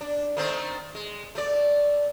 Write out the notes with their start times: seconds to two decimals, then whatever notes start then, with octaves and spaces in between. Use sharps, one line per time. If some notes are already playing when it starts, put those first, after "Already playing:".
0.01 D4
0.37 D#3 A3 C4
0.95 G#3
1.35 A3 D5